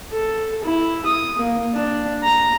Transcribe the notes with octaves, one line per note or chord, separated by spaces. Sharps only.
A4
E4
D#6
A#3
D4
A#5